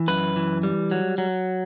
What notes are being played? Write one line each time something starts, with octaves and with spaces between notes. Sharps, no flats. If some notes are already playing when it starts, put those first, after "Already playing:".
Already playing: E3
F#2 B4
E3
G3
F#3
F#3